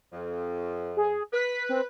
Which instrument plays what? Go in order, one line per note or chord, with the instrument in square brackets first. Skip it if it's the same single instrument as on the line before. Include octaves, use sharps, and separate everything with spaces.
[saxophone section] F2
[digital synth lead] G#4
[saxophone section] B4 [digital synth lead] B6
[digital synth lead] C4